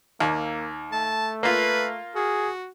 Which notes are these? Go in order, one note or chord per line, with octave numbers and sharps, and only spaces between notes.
D#2 A#3
A3 A5
A#3 F4 B4
F#4 G#4